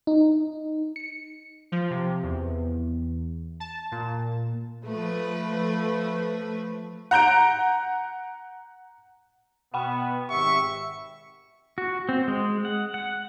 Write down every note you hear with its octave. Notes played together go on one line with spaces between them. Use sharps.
D#4
C#7
F3
C3
E2
A5
A#2
F3 A3 B4
F#5 A#5 G6 D7
B2 B3 F#5 G5 B5
G#1 G4 E5 C#6
F#4
C4
G#3
F#5
F#5